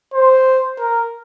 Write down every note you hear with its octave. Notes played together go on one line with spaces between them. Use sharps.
C5
A#4